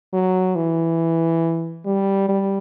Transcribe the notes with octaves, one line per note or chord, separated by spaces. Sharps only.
F#3
E3
G3
G3